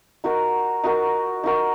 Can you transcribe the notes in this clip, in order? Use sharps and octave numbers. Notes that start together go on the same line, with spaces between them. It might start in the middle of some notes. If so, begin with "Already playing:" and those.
D#4 F#4 A#4
D#4 F#4 A#4
D#4 F#4 A#4